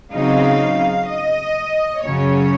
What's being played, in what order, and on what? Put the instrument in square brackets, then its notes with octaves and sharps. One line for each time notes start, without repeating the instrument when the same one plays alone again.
[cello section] C#3 F#3 C4 D#4 F5
D#5
F#2 C#3 F#3 C#4 C#5